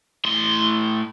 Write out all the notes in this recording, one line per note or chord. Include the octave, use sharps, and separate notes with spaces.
A2 C6